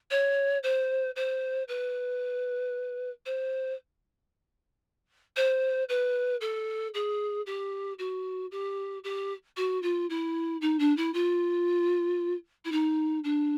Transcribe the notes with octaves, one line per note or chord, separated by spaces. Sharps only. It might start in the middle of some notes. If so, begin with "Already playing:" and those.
C#5
C5
C5
B4
C5
C5
B4
A4
G#4
G4
F#4
G4
G4
F#4
F4
E4
D#4
D4
E4
F4
E4
D#4
D4